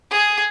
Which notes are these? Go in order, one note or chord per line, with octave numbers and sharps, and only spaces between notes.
G#4